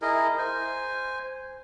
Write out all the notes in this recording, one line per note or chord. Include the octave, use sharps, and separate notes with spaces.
E4 G#4 A#4 D#5
C5 G#5